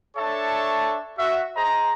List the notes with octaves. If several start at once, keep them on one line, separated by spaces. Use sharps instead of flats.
D4 A4 C#5 E5 A5 C#6
F#4 E5
G#4 C5 D#5 A#5